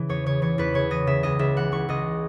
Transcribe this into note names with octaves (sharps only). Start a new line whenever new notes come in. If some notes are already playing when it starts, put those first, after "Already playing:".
Already playing: C#3 E3
E2 C#5
C#3 C#5
E3 C#5
E2 B4
C#3 C#5
E3 D#5
C#3 E5
C#2 D#5
C#2 E5
E3 F#5
E3 C#6
C#2 D#5